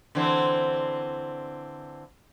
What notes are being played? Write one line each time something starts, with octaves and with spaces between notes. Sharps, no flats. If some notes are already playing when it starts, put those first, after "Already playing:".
D3 E3 C4